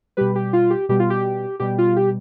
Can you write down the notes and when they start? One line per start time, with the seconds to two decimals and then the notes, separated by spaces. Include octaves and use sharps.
0.17 B2 G3 G4 B4
0.35 G4
0.53 F4
0.70 G4
0.89 B2 G3 G4
0.99 F4
1.10 G4
1.60 B2 G3 G4
1.78 F4
1.96 G4